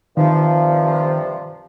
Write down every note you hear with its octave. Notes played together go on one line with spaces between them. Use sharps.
G2 C3 D#3 F3